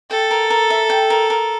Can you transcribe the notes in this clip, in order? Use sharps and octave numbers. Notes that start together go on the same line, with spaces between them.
A4 G5
A#4
A#4
E5
G5
A#4
A#4